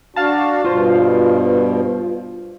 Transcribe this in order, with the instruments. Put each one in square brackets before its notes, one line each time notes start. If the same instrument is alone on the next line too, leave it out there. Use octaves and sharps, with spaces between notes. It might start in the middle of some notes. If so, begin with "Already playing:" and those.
[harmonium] D4 F#4 [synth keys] F5 A5
[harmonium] G2 B2 [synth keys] F4 C5